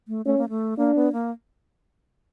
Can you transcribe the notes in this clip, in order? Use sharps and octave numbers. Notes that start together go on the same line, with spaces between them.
A3
A3 C#4
A#3
A3
A#3 D4
B3
A#3